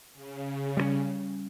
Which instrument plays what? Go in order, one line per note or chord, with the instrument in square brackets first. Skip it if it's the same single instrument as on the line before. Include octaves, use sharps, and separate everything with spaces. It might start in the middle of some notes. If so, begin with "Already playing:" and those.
[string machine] C#3
[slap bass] G3 G#3 C#4